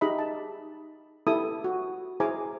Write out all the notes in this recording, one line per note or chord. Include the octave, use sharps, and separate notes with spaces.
D#4 G4 G#4 D#5 E5 B5
A5
E4 G4 A4 D#6
F#4
E4 G#4 C5 G#5 A#5 D6